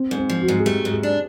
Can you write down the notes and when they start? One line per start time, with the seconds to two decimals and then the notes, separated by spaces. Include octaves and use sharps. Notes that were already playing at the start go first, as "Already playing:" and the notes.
Already playing: C4
0.11 G#2
0.17 C4
0.29 F3
0.42 F#4
0.48 G#2
0.60 G#4
0.66 A3 G4
0.85 G#2
0.91 G#4
1.03 D4